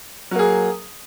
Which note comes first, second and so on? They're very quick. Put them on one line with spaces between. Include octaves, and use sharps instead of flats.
F#3 A#3 G#4